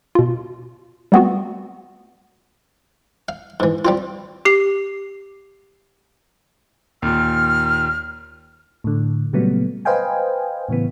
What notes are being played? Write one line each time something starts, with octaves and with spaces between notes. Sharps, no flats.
B2 F4
G3 A3 B3 C4 F4 F#4
F5
G#2 E3
G3 C4 F4
G4 C7
D#2 A#2 F6
A2 D3
A#2 C#3 F#3 G3 A3 B3
B4 C5 D#5 F5 G5 G#5
A2 C#3 E3 B3